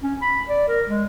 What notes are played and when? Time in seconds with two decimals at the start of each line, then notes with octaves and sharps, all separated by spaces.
0.03 C#4
0.22 B5
0.49 D5
0.68 A#4
0.88 G#3